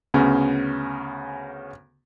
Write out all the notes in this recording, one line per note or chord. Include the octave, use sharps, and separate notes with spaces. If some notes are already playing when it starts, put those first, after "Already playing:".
D2 C#3 B3 C#4